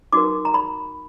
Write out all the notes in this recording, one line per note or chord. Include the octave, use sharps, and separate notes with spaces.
D#4 F#4 A#4 D6
A#5
B5